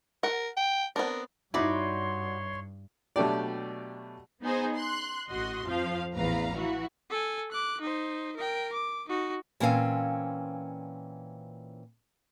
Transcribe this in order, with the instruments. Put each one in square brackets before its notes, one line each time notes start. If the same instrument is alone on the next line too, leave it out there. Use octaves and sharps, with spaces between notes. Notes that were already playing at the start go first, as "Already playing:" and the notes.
[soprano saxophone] A#4 [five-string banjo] F#5
[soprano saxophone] G5
[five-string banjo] B3 C4 D4 [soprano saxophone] A#4
[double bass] G2 [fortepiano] D#4 E4 [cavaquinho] F#4 D5 B5 [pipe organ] C#5 C6
[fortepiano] B2 F#3 A3 D4 G4 D5
[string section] B3 D#4 G#4 C5
C6 F#6
A1 F#4 D#5 C6
F2 F3 F5
A1 E2 B4 F5 A#5
E3 F#4
[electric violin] A4 G#5
D6 F#6
D#4 C5
A#4 G5
D6
D#4 F#4
[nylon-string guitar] A#2 E3 C4 C#4 F5 G#5